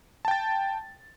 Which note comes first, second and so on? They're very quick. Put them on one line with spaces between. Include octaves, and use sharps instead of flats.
A5 G5 A6